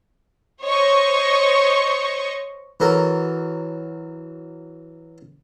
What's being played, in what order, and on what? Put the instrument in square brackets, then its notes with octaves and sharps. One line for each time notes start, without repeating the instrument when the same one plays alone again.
[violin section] C5 C#5 D#5 C#6
[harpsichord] E3 F#3 A4 A#4